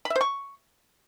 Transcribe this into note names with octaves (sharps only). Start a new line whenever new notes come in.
B5
E5
C5
C#6